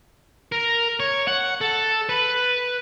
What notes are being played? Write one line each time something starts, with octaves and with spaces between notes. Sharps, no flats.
A#4
C#5
F#5
A4
B4